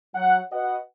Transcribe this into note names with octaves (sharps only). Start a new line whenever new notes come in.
F#3 F#5
F#4 B4 D#5 F#5